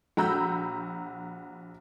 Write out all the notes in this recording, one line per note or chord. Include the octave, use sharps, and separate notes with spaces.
A#1 F#4 A#5 B5 E6 G6